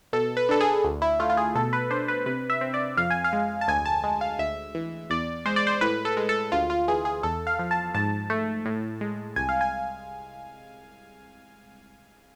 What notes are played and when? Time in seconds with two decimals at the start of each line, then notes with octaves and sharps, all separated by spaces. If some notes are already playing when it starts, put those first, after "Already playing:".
0.13 B2 A4
0.37 B4
0.49 D4 A4
0.60 G#4
0.84 D2
1.02 E4
1.20 A3 F4
1.30 F4
1.37 G#4
1.55 B2 A4
1.73 B4
1.90 D4 C5
2.08 B4
2.26 C3 B4
2.50 E5
2.61 C4
2.74 D5
2.97 F2 F5
3.10 G#5
3.24 F5
3.33 G#3
3.61 A5
3.68 D2 G#5
3.86 A5
4.04 G#3
4.21 F5
4.39 D2 E5
4.75 E3
5.10 E2 D5
5.46 G#3 C5
5.56 D5
5.67 C5
5.81 A2 B4
6.05 A4
6.17 G#3
6.29 A4
6.52 D2 F4
6.70 F4
6.88 E3 G#4
7.05 G#4
7.23 E2 A4
7.47 F5
7.59 F3
7.71 A5
7.94 G#2 A5
8.30 A3
8.66 A2
9.01 G#3
9.36 C2 G#5
9.49 F5
9.61 G#5